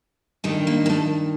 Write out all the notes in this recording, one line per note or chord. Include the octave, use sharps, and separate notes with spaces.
G2 D#3 A3
A#3
A#3
A3